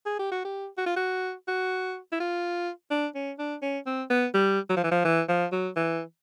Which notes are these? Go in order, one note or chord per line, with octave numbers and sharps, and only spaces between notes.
G#4
G4
F#4
G4
F#4
F4
F#4
F#4
E4
F4
D4
C#4
D4
C#4
C4
B3
G3
F#3
F3
E3
F3
E3
F3
F#3
E3